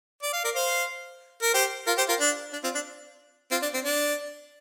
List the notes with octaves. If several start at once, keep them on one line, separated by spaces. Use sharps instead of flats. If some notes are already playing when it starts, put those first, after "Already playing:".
D5
F5
A#4 D5
C5 F5
A#4
G4 C5
F4 A#4
G4 C5
F4 A#4
D4
D4
C4 F4
D4
C4 F4
D4
C4
D4